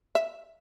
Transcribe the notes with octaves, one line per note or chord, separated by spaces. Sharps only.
E5